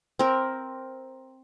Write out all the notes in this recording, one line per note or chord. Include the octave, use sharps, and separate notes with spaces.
C4 A#4